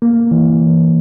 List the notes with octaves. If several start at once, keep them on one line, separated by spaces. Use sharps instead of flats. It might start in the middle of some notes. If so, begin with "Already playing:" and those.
A#3
E3